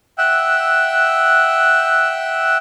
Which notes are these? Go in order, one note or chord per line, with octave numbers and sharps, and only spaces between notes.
E5 F#5 G5 E6 F#6